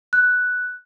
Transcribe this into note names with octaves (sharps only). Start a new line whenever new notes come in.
F#6